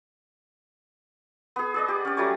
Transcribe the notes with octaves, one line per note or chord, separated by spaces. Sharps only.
B3 G#4
G#4 D5 D#5
G4 D6
C#4 D5
F#3 G3 A3 C#5